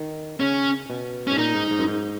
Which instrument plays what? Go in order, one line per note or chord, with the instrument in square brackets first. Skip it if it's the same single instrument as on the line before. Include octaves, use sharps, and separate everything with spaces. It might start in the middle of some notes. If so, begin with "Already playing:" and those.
Already playing: [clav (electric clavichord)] D#3
[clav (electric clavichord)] C#3 [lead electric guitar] C#4
[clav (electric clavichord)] B2
[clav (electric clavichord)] G#2 [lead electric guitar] C#4
[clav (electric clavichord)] A#2 [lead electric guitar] D#4
[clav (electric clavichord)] G#2
G#2
F#2
G#2